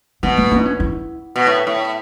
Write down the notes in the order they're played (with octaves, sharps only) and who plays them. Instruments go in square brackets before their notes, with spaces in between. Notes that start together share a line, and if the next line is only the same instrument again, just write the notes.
[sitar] B2 [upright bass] B3
[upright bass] A3
A3
E4
C#4
E4
[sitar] B2
A2
A2